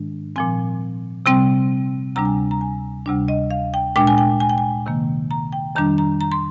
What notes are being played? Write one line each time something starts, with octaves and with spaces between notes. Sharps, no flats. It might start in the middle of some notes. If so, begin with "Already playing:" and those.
Already playing: G#2 D#3 G#3 D4
A#2 F3 C4 G#5
C3 G3 C4 G5
D2 C3 G3 D4 A#5
G#5
A#5
A#5
G#5
D2 C3 G3 D4
D#5
F5
G5
A#2 G#3 D4 G5
G#5
G5
G#5
G5
G#5
C3 D#3 A#3
A#5
G5
F2 D#3 G3 D4 A#5
A#5
A#5
C6